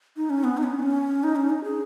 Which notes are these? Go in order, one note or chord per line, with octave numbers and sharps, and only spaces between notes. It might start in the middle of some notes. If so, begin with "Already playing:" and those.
D#4
C#4
B3
D#4
C#4
B3
C#4
D#4
C#4
D#4
G#4